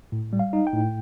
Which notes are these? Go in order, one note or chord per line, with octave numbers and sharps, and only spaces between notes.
A2
G3
F5
D#4
G5
A2